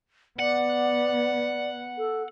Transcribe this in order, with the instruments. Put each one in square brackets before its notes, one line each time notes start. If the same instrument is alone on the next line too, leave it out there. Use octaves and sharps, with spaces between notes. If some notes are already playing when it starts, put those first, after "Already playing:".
[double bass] B3 [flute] D5 [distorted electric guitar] F#5
[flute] A4